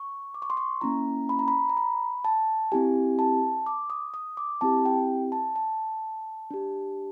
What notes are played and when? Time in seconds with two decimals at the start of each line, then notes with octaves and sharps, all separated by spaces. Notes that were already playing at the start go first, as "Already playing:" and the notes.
Already playing: C#6
0.34 D6
0.42 C#6
0.50 C6
0.57 C#6
0.81 A#3 C#4 E4 A#5
1.29 B5
1.39 A#5
1.48 B5
1.69 A#5
1.77 B5
2.25 A5
2.72 C4 E4 G4 G#5
3.19 A5
3.66 D6
3.90 D#6
4.14 D#6
4.37 D6
4.61 C4 E4 G4 A5
4.85 G5
5.32 A5
5.56 A5
6.51 D4 G4